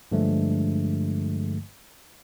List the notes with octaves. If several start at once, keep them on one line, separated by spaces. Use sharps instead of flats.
G2 D3 F3 G#3 A3